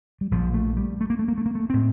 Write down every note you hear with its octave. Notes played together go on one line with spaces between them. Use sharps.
G3
A#1 A#2 F3
A3
G3
A3
A#3
A3
A#3
A3
A#3
A3
A2 C4